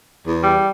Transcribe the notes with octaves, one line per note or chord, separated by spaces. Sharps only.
E2
G3